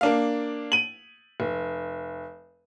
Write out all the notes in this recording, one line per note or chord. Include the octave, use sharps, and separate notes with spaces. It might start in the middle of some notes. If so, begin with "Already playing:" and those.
A#3 D4 F5
D#7 F#7
F1